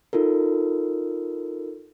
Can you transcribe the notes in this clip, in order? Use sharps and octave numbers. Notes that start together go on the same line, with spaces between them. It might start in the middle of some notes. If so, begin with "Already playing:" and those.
D#4 F4 A4 A#4